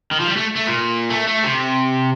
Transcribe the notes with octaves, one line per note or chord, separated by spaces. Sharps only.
D#3
F3
G3
A3
A3
A#2
A3
A3
C3